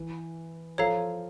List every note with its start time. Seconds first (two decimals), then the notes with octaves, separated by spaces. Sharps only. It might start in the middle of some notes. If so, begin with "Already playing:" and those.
Already playing: E3
0.78 F3 A4 C#5 F5 A#5